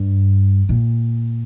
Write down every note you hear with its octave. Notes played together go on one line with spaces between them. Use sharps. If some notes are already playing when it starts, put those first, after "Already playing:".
Already playing: G2
A#2